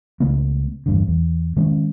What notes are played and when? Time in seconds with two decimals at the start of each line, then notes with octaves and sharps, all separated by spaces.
0.20 C#2 C#3 A3 B3
0.86 E2 G2 D3
1.08 E2
1.57 D#3 G#3 C4 C#4